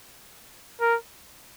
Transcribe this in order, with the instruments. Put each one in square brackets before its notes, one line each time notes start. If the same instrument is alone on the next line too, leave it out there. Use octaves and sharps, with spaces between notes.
[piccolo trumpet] A#4